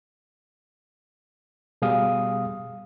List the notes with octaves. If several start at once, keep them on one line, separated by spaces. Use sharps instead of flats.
B2 G3 G#4 F5 D#6